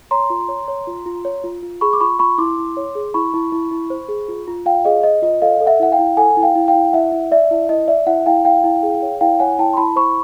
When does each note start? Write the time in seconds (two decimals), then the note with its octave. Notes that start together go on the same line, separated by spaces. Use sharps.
0.11 C#5 A#5 C6
0.30 F4
0.49 C#5
0.68 C#5
0.87 F4
1.06 F4
1.25 C#5
1.44 F4
1.62 F4
1.81 G#4 B5 C#6
1.93 D6
2.00 F4 B5 C#6
2.19 F4 B5 C#6
2.38 E4 C6 D6
2.58 E4
2.77 C#5
2.95 G#4
3.14 E4 B5 C#6
3.34 E4
3.52 E4
3.71 E4
3.90 C5
4.09 G#4
4.28 F4
4.48 F4
4.66 F4 F5 G5
4.85 G#4 D#5 F5
5.03 C5 D#5
5.22 F4 D#5
5.42 A4 D#5 F5
5.60 A4
5.66 E5 F#5
5.80 E4 F#5
5.92 F5 G5
5.99 E4
6.17 A4 F#5 G#5
6.37 E4
6.42 F5 G5
6.55 E4
6.68 F5 G5
6.75 E4
6.93 E4 E5 F#5
7.12 E4
7.31 D5 E5
7.51 E4
7.69 E4 D#5
7.88 D5 E5
8.07 E4 E5 F#5
8.26 E4 F5 G5
8.45 E4 F5 G5
8.64 E4
8.83 G#4
9.02 C#5
9.21 E4 F5 G5
9.39 C#5 F#5 G#5
9.59 E4 G5 A5
9.73 C6
9.77 E4 A5 B5
9.96 C5 B5 C#6